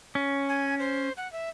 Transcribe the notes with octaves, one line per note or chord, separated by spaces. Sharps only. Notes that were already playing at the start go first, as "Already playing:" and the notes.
C#4
G#5
C5
F#5
E5